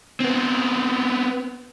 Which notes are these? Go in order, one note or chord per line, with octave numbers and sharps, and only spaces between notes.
B3 C4